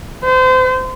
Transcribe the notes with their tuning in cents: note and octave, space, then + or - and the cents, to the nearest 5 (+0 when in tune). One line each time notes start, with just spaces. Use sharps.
C5 -30